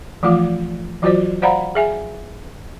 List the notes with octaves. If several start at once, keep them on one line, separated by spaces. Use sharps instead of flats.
E3 F3 A3 F4 F5
E3 F#3 F4 F#4 C5 D5
C5 D5 F5 F#5 A#5 B5
G#4 E5 G#5